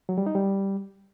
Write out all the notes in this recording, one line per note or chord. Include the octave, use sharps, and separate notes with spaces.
F#3
G3
D#4
G3